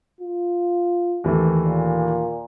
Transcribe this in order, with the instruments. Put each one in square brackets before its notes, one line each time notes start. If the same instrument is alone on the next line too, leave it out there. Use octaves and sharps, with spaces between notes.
[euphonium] F4
[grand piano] D#2 E3 A3
[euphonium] A#2